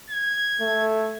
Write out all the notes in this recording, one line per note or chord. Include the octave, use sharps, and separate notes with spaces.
G#6
A3